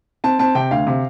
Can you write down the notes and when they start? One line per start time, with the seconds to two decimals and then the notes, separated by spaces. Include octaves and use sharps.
0.24 C4 A5
0.39 C4 A5
0.55 C3 G5
0.71 D2 F5
0.87 C3